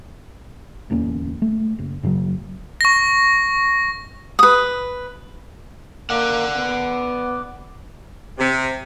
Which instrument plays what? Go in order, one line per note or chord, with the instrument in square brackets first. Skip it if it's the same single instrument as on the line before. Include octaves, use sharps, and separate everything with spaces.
[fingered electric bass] D1 E2 A#3 C#4
A3
F#1
F#2 C#3 E3 F#3
[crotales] C#6 A#6
[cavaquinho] B4 D#6
[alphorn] A#3 [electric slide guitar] D5 F#5
[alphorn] B3
[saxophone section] C3